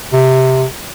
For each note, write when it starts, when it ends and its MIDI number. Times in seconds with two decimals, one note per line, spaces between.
0.13 0.65 48